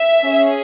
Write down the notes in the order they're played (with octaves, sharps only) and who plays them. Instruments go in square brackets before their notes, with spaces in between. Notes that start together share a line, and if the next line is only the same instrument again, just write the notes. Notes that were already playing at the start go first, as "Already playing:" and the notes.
Already playing: [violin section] E5
C#4 G#4